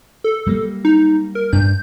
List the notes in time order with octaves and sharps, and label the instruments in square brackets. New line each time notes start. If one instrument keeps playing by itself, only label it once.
[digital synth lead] A4
[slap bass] F#3 G3 A#3
[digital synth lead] D#4
A#4
[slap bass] G2 D4 [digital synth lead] G6